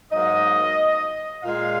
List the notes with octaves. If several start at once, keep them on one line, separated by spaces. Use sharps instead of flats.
G#2 F#3 A#3 D#5
A#2 G#3 F5